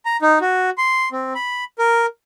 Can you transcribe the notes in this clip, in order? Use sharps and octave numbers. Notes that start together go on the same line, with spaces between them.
A#5
D#4
F#4
C6
C4
B5
A#4